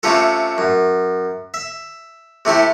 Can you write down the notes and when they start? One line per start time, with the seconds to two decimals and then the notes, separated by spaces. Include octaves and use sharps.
0.03 C3 A3 C#4 F4 A4
0.58 F#2
1.54 E5
2.45 C3 A3 E4 G4